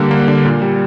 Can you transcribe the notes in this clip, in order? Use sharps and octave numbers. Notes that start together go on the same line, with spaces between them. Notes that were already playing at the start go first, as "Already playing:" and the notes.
Already playing: D3 G3 A#3
A#3
D3
A#2
G3